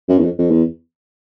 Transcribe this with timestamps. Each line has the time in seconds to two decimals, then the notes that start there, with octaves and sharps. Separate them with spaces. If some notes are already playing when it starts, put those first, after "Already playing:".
0.09 F#2
0.19 E2
0.24 F2
0.39 F2
0.51 E2